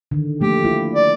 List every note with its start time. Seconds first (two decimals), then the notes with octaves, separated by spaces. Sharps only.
0.11 D3 D#3
0.41 F3 A3 A#3 G4
0.63 D4 E4 F4
0.94 D5